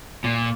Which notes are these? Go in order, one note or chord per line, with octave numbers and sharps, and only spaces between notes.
A#2